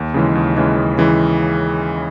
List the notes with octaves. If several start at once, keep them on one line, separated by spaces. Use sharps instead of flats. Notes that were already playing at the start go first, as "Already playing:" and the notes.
Already playing: D#2
C#3 E3 G#3
D#2
C#3 E3 G#3
D#2
C#3 E3 G#3